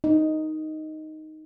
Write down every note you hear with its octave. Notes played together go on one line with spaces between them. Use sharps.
D#4